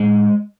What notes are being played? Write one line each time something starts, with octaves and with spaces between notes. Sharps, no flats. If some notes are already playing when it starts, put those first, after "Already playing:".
Already playing: A2 G#3